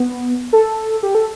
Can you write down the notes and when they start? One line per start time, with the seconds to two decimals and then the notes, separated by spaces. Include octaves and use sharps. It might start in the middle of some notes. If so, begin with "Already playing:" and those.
Already playing: B3
0.53 A4
1.03 G4
1.15 A4